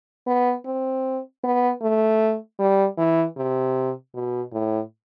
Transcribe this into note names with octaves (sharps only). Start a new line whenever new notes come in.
B3
C4
B3
A3
G3
E3
C3
B2
A2